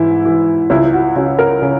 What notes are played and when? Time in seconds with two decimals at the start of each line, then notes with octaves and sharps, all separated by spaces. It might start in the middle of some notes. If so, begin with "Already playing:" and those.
Already playing: G#2 E3 E4
0.25 E3
0.70 C#2 E4
0.93 F#4
1.16 C#3 F#4
1.39 A#4
1.62 C#3